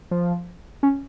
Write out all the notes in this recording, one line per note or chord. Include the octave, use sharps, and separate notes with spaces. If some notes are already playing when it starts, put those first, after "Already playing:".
F3
C#4